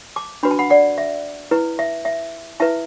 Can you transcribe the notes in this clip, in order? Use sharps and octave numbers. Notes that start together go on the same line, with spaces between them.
A5 D6
D4 F#4 B4 B5
A5
F#5 B5
D5 F#5
E5
E4 B4
E5
E5
E4 B4 E5 A5